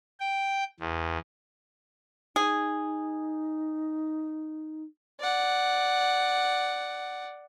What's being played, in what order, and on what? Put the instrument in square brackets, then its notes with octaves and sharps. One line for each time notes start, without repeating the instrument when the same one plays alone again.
[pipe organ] G5
E2
[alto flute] D#4 [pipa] G#4
[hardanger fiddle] D5 F#5